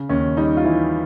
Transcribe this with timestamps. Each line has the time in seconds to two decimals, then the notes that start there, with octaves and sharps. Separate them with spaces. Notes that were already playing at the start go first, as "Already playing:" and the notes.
Already playing: C#3
0.09 D#2 C#4
0.37 G3 D#4
0.57 F4
0.64 E3 E4